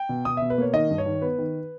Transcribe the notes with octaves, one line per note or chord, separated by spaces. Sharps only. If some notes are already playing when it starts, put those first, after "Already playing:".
Already playing: G5
B2
B2 D#6
B2 E5
B4
A#3 C#5
D#3 D#5
G2
C#5
D#3
B3 B4
D#3